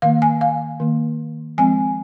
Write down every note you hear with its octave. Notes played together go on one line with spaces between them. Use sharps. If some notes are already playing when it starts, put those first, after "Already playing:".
D#3 A#3 F5
G#5
F5
D#3 A#3
F3 G#3 C4 G#5